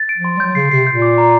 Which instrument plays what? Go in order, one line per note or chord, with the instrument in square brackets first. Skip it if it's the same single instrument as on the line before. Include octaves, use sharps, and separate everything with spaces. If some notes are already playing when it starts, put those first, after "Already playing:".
Already playing: [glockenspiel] A6
D7
[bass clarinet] F3
[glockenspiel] C6
[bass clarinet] G3
[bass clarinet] F#3 [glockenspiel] G6
[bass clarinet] C#3 [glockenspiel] C7
[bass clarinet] C3 [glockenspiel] C7
[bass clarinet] A#2 [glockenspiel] G6
[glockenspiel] D6
A#5